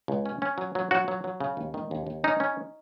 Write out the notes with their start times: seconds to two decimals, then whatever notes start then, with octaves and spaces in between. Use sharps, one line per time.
0.08 C#2
0.26 C#4
0.42 C#4
0.58 F#3
0.75 F#3
0.91 F#3 F#4
1.08 F#3
1.24 F#3
1.40 C#3
1.57 D#2
1.74 D#3
1.91 D#2
2.07 D#2
2.24 C#4 D#4
2.40 C#4